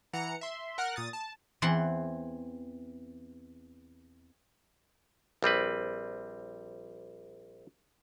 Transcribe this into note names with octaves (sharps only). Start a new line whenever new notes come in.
E3 F#5 A#5 C#7
E5 C6
A#4 F#5 F6 F#6
A#2 D#6 A6
A5
E2 E3 C4 F#5 C6
A#1 G3 C4 B4